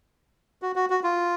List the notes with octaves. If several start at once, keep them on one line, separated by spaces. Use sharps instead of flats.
F#4
F#4
F#4
F4